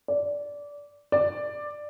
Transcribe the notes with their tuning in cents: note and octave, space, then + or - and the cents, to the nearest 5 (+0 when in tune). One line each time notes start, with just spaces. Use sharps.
D5 -15
D5 +10